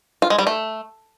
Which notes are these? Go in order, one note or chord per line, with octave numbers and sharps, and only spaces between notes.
F4
G#3
G3
A3